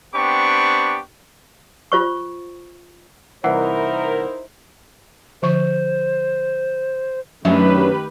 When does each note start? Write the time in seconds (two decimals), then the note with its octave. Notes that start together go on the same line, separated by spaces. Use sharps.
0.14 B3 C4 D4 G4 B5 C#6
1.92 F4 C5 C#6
3.44 C2 E3 D#4 E4 A#4 C5 F#5
5.42 D3 F3 C5 C#6
7.45 F#2 D#3 F#3 A3 D4 G4 B4 E5